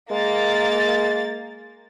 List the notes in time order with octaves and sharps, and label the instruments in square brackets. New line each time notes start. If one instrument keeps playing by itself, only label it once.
[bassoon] G#3 [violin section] A#3 A6